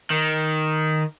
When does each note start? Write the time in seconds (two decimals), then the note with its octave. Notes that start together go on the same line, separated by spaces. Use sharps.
0.10 D#3